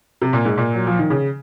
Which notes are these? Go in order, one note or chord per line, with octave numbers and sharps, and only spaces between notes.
C3
A#2
G#2
A#2
F#3
F3
D#3
C#3